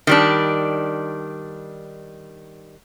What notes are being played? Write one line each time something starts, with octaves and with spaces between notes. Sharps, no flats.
D#3 G3 D4